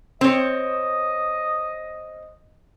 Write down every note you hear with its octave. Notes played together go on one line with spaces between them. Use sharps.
C4 C#5 D#5